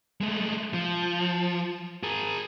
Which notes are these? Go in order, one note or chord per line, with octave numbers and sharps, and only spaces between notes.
G#3 A3
F3
G#4 A#4